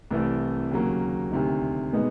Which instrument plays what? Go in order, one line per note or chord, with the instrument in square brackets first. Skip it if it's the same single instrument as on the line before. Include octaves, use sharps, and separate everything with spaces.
[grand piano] C2 C3 E3 A3
D#2 C#3 F#3 A#3
D2 C3 D#3
B2 G#3 B3 D#4